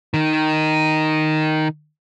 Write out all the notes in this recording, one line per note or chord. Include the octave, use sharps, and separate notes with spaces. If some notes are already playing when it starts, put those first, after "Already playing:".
D#3 D#4